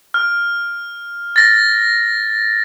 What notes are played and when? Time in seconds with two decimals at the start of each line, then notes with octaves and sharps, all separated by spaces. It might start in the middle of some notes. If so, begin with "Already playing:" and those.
0.14 F6
1.36 A6 A#6